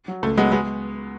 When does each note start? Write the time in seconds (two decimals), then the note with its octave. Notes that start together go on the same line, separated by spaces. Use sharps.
0.08 F#3
0.23 C#2 A3
0.37 F#3 G#3 B3
0.52 G#3 B3